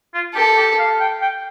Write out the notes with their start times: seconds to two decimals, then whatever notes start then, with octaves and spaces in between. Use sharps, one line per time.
0.14 F4
0.35 G4 A4
0.57 G4
0.79 F5
1.00 G5
1.22 G5